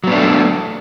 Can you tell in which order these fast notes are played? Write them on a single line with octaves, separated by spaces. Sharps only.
F#3 B3 D4 A3